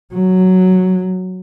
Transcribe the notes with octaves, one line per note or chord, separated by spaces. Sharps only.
F#3